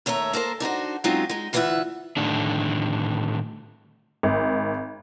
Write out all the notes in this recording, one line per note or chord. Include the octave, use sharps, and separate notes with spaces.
D#2 A3 C#5 E5 A#5
A#3 A4 A#4 C5
D4 D#4 F#4 C5
F#3 G#3 C4 C#4 D#4 F4
G#3 D#4
D2 E3 F4 G4 E5 F#5
A2 D3 D#3 D4
G#1